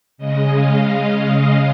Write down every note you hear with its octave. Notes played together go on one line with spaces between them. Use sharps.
C#3 G#3 D#5
F5